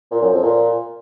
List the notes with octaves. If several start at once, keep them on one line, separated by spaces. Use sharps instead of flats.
A#2
F#2
F2
A#2